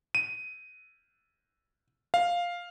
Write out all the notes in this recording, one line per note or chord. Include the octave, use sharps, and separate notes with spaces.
D#7
F5